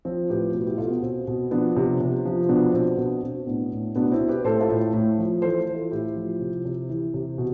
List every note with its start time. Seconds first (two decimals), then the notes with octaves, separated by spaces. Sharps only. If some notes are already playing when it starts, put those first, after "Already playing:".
0.05 F3 C4
0.29 A2 G4 B4
0.54 B2 G4 B4
0.67 E4 G4
0.78 B2 F4 A4
0.90 B3
1.03 B2 C4
1.27 B2
1.51 F3 B3 D4
1.77 C3
2.00 C3
2.25 F3
2.49 B2 B3 D4
2.74 B2 C4
2.98 B2 B3 D4
3.23 B2 C4
3.47 A2 B3 D4
3.72 A2
3.96 B2 B3 D4
4.12 C4 E4
4.20 B2
4.28 G4 B4
4.44 A2 A4 C5
4.61 F4 A4
4.69 A2
4.93 A2
5.18 F3
5.42 E3 A4 C5
5.67 E3
5.75 F4 A4
5.91 A2 E4 G4
6.16 F3
6.41 C3
6.65 C3
6.89 E3
7.14 C3
7.38 B2